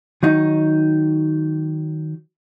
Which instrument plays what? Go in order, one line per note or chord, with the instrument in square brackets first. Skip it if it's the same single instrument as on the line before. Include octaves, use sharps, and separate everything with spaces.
[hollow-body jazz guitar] D#3 F#3 D#4